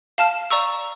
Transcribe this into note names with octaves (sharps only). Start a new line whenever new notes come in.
F5 A5 F6 E7
D5 A#5 C#6 E6